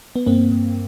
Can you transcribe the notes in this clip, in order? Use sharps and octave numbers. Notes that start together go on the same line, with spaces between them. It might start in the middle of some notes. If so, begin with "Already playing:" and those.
B3
G2 A#3 C4
G2